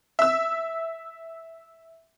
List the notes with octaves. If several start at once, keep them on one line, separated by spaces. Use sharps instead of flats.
E5 E6